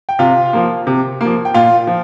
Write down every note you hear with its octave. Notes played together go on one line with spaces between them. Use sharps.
G5
C3 F4 F5
F3 A#3
C3
F3 A#3
G5
A#2 F4 F5
F3